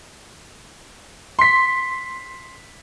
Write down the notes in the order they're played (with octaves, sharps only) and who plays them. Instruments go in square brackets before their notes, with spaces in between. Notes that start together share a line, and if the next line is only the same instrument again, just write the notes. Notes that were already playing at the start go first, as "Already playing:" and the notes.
[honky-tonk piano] C6 B6